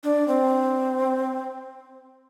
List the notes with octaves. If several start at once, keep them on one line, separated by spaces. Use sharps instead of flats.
D4
C4